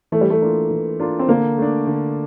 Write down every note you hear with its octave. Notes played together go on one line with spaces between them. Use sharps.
E3 A3
G3
A3
A#3 D4 F4
E3
A#3 D4 F4
C4
D3 A#3
A3 D4
D3